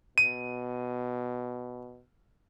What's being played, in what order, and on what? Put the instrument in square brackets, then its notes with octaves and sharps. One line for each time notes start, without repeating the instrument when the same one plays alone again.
[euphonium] B2 [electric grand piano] D#7